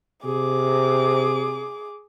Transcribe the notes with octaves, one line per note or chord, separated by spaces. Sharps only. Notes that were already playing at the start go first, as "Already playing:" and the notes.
C3 G#4 D6